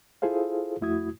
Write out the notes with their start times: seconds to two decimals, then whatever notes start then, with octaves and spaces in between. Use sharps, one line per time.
0.22 E4 F4 G#4 A4 C5 F5
0.81 F2 A3 E4 F#4 D#6 G#6